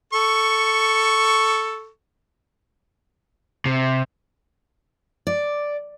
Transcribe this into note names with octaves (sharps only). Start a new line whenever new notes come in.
A4 C#6
C3
D5